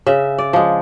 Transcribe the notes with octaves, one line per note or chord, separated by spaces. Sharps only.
C#3 E5
D5
F3 G#3